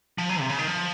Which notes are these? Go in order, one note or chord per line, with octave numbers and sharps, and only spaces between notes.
F3
F#3
C3
C#3
D#3
F3